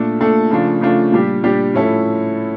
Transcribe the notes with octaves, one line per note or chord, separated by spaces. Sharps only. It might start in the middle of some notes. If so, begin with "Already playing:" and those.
Already playing: A#2 A3 D4 A4
A#2 A3 D4 A4
C#3 F3 A3 D4 F4
C#3 F3 A3 D4 F4
A#2 G3 D4 G4
A#2 G3 D4 G4
A2 F3 C#4 E4 A4